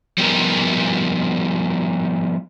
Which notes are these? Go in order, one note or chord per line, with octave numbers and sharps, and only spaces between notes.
F3 G3 B3 D#4 G4 A#4